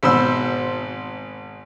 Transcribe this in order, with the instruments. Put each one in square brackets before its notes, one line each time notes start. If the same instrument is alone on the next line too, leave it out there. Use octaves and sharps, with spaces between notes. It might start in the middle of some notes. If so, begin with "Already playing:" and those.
[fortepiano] G#1 B2 C5 B5 E6